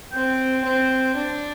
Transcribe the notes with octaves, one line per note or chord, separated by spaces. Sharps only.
C4 G5
C4
D4